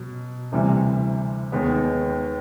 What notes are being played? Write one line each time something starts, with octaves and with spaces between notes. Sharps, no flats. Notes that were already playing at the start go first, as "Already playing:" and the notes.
Already playing: B2 F#3
D2 C3 E3 G3
D#2 D#3 G#3 B3